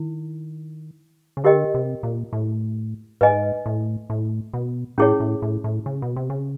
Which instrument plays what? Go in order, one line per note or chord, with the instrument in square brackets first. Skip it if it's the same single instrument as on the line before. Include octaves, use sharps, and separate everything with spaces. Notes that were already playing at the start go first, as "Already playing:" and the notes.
Already playing: [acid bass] D#3 [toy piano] E4
[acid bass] C#3
[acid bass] D3 [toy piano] G4 A#4 D#5 G5
[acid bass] C3
A#2
A2
[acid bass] G#2 [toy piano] B4 D#5 G#5
[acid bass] A2
A2
B2
[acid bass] A2 [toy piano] C#4 E4 G#4 C#5
[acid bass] A2
A2
A2
C#3
B2
C3
C#3